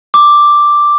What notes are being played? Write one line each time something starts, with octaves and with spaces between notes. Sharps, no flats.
D6